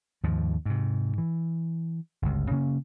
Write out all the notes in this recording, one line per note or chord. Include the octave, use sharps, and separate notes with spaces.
D#2 G#2 F3
G#2 C3
E3
G1 C#2
C#3 A#3 C#4